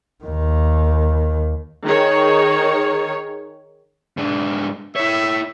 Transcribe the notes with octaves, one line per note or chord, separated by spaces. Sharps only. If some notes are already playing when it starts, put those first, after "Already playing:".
D#2 D#3
D#3 G#4 C#5
G#2 D4
E4 C#5 E5